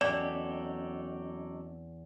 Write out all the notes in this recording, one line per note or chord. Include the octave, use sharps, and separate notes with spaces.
E2 F#3 C4 C#4 G4 A4 D5 D#5